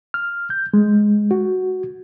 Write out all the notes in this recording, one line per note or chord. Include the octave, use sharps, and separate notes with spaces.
F6
G6
G#3
F#4